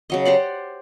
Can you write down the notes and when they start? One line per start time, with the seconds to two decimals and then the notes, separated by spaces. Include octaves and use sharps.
0.10 C#3 F#3 D#5
0.25 G4 C5 D5 F#5